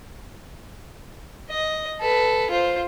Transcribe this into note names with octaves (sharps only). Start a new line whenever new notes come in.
D#5
A4 B4
F4 C5